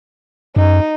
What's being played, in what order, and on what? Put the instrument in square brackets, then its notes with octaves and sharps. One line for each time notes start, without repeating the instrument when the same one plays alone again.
[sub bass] F#2 [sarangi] D#4